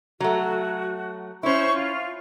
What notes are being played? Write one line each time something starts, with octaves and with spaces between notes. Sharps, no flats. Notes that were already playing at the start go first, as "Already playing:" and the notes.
F#3 A3 F#4
C#4 E4 C5 C#6
F4